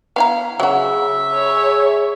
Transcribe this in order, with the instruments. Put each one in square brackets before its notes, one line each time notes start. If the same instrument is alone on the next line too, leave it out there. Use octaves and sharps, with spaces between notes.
[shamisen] B3 E4 A#5 [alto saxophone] F5
[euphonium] C#3 [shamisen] F#3 F#4 [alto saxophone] E5
[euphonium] G#4 [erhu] C#5